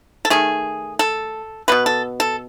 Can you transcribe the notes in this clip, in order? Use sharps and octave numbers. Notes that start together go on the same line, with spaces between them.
A4
D#3 A3 G#4
A4
B2 G#3 B3 B4
A4
A4